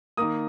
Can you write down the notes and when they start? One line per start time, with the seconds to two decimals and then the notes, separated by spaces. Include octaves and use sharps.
0.17 D#3 A#3 D#6